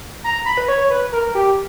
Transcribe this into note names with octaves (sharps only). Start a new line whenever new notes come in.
A#5
B5
B4
C#5
B4
A#4
G4